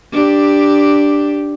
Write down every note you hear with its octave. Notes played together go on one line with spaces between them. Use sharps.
D4 G4